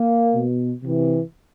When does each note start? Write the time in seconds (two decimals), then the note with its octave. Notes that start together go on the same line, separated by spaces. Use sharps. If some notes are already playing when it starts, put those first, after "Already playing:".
Already playing: A#3
0.34 B2
0.81 C3 E3